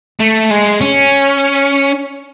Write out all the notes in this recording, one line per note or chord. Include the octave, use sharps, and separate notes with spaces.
A3
G#3
C#4